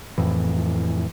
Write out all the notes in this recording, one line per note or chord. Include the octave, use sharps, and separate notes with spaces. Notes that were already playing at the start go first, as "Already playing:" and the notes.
F2 A2 E3